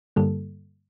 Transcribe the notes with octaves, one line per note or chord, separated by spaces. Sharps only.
G2 D3 G3 A#3 A4